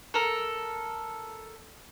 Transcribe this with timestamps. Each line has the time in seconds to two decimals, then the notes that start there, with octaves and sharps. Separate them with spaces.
0.14 A4 A#4